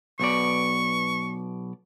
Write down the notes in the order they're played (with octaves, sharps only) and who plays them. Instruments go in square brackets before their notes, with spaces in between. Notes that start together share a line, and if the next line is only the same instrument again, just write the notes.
[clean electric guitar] B1 B2 D5 [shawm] C#6